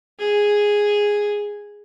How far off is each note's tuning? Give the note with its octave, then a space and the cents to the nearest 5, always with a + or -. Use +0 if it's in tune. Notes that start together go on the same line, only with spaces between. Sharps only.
G#4 -5